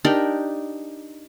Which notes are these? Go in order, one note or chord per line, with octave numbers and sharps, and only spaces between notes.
D4 D#4 G4 A#4